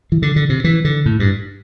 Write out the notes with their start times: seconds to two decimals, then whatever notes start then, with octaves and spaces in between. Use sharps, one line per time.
0.12 E3
0.22 D3
0.36 D3
0.49 C3
0.64 E3
0.85 D3
1.06 A2
1.20 G2